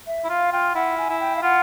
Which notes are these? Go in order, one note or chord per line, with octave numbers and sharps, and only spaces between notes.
E5
E4
F4 F5
F4 G5
E4 F#5
G#5
E4
G5
F5
F4 F#5